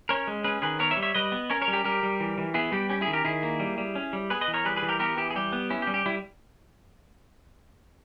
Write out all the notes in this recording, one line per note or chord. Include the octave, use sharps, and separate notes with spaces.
C#4 A#4 C#5
G#3
C#4 G#4 B4
D#3 G#4 B4
B3 A#4 C#5
C#5 E5
G3
C#5 E5
G3 B4 D#5
B3
C#4 A#4 C#5
A#4 C#5
G3
G4 A#4
G3 G4 A#4
G3
E3
E3
B3 E4 G#4
G3 G4
C#4 G4
E4 G#4
D#3
G4 A#4
D#3 E4 G#4
A#3
G3
G3
C#4
G3
B3 G#4 B4
B4 D#5
E3
A#4 C#5
G3 G#4 B4
G#4 B4
E3
G4 A#4
B3 G4 A#4
E3 G4
G#4
G3 G4
B3
C#4 E4
G4
G3
G4
G3 E4